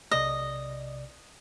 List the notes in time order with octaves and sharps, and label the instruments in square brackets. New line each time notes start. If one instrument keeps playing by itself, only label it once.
[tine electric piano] B1 C3 D5 [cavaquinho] D#5